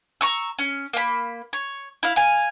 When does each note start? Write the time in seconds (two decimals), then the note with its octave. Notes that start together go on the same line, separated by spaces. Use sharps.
0.21 A#5 C#6 E6
0.59 C#4
0.93 A#3 B5
1.53 C#5
2.03 E4 F5
2.16 F5 G#5